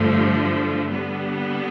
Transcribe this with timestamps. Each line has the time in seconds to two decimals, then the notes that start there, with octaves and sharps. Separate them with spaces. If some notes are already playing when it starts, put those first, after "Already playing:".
Already playing: G2 D3 F3 A3
0.92 D3 G3 B3